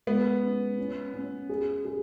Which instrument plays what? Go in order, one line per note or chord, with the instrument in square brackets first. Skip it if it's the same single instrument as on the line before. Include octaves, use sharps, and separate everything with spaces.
[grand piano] G#3 [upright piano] B3
[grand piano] C#4
C#4
C#4
G#4
G#4